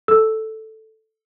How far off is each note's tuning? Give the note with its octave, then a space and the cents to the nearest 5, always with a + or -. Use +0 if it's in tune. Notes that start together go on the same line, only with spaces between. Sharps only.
A4 +0 E6 +0